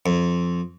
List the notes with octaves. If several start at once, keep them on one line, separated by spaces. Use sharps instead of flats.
F2